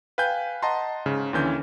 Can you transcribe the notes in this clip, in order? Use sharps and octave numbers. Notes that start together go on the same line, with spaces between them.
B4 F5 G5 G#5 G6
D#5 F#5 A5 A#5 C6
G#2 C#3
D#2 D3 E3 C#4 G6